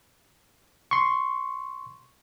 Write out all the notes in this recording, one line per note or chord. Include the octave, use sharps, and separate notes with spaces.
C6 C#6